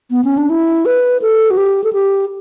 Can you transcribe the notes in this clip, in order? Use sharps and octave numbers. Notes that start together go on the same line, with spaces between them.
B3
C#4
D4
E4
B4
A4
F#4
G4
A4
G4